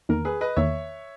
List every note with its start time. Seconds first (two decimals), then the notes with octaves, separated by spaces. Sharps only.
0.09 E2 D#3 A#3 A#4
0.25 G#4 B4
0.41 B4 D#5
0.57 E2 D#3 A#3 C#5 E5